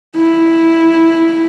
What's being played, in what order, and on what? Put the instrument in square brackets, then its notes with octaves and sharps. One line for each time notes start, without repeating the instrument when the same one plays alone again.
[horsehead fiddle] E4